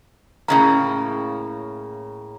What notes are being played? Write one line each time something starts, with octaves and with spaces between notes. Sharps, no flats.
A2 C#3 A#3 A#5